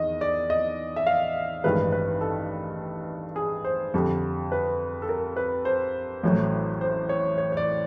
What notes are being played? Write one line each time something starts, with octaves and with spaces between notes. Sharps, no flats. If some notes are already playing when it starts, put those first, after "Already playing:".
Already playing: E2 D#3 D#5
D5
D#5
E5
F5
A1 G2 D#3 G#3 B4
B4
A4
G#4
C5
F2 D3 G3
B4
A4
A#4
B4
C5
A1 A2 F#3 A3
C5
C#5
C#5
C#5
D5